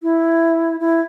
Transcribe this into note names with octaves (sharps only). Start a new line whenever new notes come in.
E4
E4